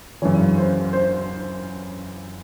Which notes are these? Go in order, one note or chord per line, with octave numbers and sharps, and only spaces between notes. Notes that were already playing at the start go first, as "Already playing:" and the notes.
F#2 C#3 E3 C#5
C5
C5